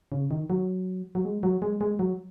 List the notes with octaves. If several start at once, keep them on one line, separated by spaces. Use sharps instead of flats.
C#3
D#3
F#3
F#3
G#3
F#3
G#3
G#3
F#3